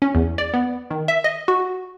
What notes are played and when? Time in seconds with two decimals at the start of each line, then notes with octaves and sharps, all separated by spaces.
0.02 C#4
0.15 E2
0.38 D5
0.54 B3
0.90 D#3
1.08 E5
1.24 D#5
1.48 F#4